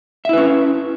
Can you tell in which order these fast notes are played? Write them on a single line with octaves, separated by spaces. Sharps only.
E5 E4 B4 C#4